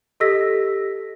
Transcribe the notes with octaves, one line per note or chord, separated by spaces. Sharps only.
G4 A4 D#5 E6 A#6 B6